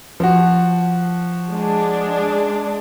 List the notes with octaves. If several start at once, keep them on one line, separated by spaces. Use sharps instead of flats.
F3 F#4
G#3 D4